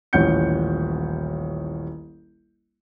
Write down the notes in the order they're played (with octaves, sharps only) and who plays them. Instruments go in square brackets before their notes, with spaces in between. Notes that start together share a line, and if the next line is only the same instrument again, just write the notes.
[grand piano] D#1 A1 C#4 F#5 G6 C#7